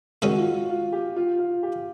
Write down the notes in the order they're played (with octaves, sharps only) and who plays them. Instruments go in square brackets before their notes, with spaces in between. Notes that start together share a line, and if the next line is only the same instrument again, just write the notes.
[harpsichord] D#3 G#3 C#4 E4 [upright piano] F#4
[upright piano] F4
F4
F4
G4
F4
F4
G4